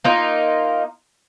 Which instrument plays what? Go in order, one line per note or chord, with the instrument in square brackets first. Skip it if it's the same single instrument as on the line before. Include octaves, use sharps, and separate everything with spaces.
[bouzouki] A#3 D#4 F4